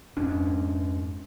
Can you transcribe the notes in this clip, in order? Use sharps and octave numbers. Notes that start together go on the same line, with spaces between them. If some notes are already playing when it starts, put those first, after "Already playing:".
F2 G#2 C#4 D4